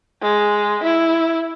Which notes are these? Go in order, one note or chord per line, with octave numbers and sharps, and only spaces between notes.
G#3
E4